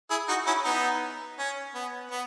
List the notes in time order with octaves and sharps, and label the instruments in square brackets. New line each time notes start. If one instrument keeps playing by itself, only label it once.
[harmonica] E4 G#4
D#4 F#4
C#4 E4
B3 D#4
C#4
B3
B3